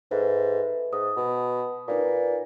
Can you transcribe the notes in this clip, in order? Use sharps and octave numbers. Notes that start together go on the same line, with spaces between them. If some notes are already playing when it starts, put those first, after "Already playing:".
G#2 A4 B4 E5
G#2 D#6
B2
A#2 D#4 B4 D6